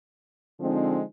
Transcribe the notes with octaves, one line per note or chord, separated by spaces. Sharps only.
D3 F3 G#3 C4 D#4